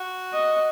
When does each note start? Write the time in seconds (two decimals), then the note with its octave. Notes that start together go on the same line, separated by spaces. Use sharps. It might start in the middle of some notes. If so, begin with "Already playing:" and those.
Already playing: F#4
0.33 D#5